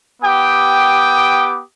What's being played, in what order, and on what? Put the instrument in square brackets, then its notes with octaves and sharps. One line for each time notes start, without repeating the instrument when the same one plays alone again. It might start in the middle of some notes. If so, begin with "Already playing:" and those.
[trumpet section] B3 G4 G5 D6 D#6